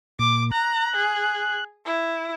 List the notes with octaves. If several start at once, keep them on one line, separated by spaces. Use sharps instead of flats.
A#2 D6
A#5 F#6
G#4
E4